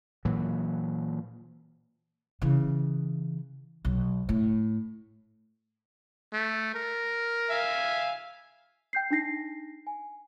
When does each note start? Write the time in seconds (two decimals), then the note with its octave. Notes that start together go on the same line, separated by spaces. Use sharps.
0.25 A#2 E3 F#3
2.42 C#3 E3
3.85 B1
4.29 A2
6.33 A3
6.74 A#4
7.50 E5 F5 G#5
8.93 G5 G6 C7
9.11 D4 D#4 A#6 C7
9.87 G#5